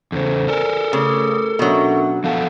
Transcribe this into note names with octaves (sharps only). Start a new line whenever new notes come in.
E2 C#3 A4 C5
A4 A#4 D5 G#5
C#3 A3 D6 D#6
B2 F#3 C#4 D4 E5
F3 B3 A4 F5 F#5